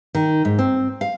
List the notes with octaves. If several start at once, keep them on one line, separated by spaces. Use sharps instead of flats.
D#3
G#2
C4
F5